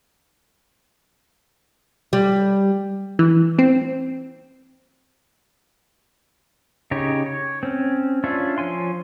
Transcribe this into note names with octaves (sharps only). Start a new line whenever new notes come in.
G3
E3
C4
C#3 D#4 G4 C#5
C#5
C4 C#4
C#4 D4 F4 C#5 E5
F3 C#5 G#5 C6